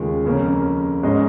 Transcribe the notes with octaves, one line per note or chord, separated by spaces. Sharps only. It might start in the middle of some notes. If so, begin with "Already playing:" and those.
Already playing: D#2 C#3 G#3 F4 G#4
F2 C#3 A#3 C#4
G#2 G#3 C#4 G#4 D#5